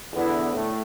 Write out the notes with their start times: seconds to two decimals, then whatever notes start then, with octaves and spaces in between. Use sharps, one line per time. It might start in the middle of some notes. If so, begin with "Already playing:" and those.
0.12 E2 D3 B3 E4
0.53 A2 A3